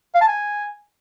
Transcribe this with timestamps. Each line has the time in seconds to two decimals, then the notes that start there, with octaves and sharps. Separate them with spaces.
0.15 F5
0.21 A5
0.28 G#5